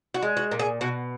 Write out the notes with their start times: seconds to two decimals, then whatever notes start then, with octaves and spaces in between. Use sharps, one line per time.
0.14 F#4
0.23 G#3
0.37 F#4
0.52 A#2
0.59 G#4
0.81 B2 F#4